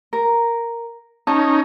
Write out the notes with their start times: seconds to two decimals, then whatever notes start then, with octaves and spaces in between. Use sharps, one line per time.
0.13 A#4
1.27 C#4 D#4 A5